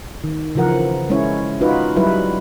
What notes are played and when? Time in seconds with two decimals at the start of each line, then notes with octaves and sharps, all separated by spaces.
0.24 D#3
0.55 C#3 E3 F3 A#4 F#5
1.10 G#3 C#4 E4 C#5
1.61 D#4 F4 F#4 B4
1.96 F#3 G3 E4 B4